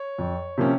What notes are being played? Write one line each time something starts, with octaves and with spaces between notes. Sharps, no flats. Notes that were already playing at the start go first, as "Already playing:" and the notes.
Already playing: C#5
F2
C3 F3 A#3 C#4